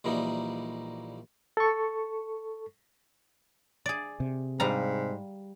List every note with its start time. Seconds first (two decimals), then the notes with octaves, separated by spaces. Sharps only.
0.04 A#1 A#2 E3 G3 D#4
1.57 A4 C#6
3.86 G#4 D5
4.20 C3
4.60 G#2 G3 F5 A#5